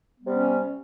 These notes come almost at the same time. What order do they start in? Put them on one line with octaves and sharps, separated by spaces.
B3 G3 C3 C#4